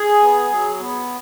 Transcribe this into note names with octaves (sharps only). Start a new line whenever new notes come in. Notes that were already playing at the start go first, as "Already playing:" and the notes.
Already playing: G#4
B3
F#3
B3